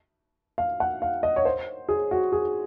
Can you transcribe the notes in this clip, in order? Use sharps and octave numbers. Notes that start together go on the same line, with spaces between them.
F5
F#5
F5
D#5
C#5
C5
G#4
F#4
G#4